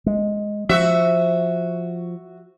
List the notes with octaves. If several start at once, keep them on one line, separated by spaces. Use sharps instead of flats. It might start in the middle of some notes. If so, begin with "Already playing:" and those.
G#3
F3 F#4 E5